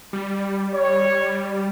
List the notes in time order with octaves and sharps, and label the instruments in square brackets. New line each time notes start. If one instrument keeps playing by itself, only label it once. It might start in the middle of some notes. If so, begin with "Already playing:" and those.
[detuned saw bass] G3
[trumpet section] C#5